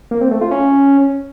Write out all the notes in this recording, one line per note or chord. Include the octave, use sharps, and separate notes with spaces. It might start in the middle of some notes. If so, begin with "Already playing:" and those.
A#3
C4
A3
F4
C#4